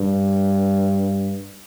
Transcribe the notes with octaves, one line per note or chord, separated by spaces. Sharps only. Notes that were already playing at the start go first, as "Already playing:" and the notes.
Already playing: G2